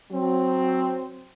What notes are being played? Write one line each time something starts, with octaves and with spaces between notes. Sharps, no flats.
F#3 C4